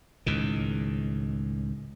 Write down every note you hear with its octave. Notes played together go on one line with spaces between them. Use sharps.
C#2 A2 D#3